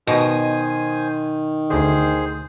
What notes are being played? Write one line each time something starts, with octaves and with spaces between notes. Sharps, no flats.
B2 D#3 C5 G#5 D#6
D2 D3 G#4 C5